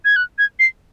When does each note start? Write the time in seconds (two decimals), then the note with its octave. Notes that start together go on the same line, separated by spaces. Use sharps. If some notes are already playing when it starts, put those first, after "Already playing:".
0.05 G#6
0.16 F#6
0.38 G#6
0.59 C7